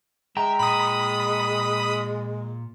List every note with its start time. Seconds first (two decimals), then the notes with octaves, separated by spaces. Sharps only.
0.37 G#3 E5 G5 A#5
0.59 A#2 B5 D#6